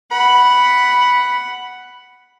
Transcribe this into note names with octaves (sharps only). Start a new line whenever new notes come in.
F#5 B5